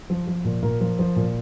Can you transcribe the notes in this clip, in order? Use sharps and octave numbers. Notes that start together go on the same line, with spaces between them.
F3
F3
A#2
A#2 A#4
F3
F3
A#2